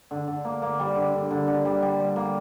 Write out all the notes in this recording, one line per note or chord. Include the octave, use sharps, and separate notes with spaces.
D3
D3
A#3
A#3
G3
D3
D3
D3
D3
G3
G3
G3
A#3